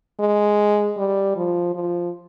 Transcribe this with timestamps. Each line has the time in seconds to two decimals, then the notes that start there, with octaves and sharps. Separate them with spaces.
0.20 G#3
0.97 G3
1.36 F3
1.75 F3